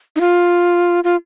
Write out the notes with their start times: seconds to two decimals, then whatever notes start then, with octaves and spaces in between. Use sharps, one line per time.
0.16 D#4
0.21 F4
1.04 F4